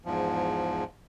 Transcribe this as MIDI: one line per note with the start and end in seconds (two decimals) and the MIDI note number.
0.05 0.84 40
0.05 0.84 44
0.05 0.84 53